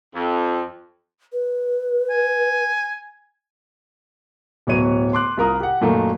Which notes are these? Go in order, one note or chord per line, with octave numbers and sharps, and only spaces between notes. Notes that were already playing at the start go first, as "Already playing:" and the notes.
F2
B4
G#5
D1 B2 F#3 B3 C#5 D#7
C6 D6 F#6
C2 F4 A#4 A#5 D#6
G4 F#5
F#2 A#2 D#3 A3 A#3